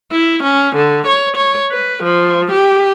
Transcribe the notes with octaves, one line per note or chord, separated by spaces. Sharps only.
E4
C#4
D3
C#5
C#5
B4
F3
G4